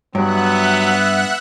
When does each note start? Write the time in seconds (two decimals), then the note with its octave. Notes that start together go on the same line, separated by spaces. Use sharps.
0.15 G2 F#3 B3 E5 F#5 F#6